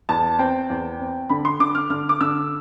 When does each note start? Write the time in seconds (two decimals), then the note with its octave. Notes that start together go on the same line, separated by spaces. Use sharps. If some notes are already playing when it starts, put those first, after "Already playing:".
0.09 E2 A5
0.39 C4 G5
0.70 E2
1.00 C4
1.29 D3 B5
1.45 C6
1.60 D3 D6
1.75 F6
1.90 D3 F6
2.09 D6
2.21 D3 E6